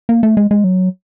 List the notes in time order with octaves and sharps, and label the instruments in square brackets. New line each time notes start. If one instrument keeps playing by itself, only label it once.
[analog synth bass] A#3
A3
G#3
G#3
F#3